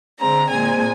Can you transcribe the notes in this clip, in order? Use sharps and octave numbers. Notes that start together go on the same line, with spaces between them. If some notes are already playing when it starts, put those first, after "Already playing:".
D3 G#3 C4 A#5
A#2 G#3 C4 G#5